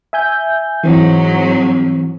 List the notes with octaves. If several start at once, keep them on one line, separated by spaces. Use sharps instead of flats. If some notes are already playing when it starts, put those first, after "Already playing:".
E5 G#5 G6
G#2 E3 F#3 C4